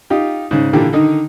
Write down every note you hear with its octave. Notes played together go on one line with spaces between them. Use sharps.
D#4 F4 G4
G#2 C#3
A#2 D3 E3 G4
D3 D#3 D#4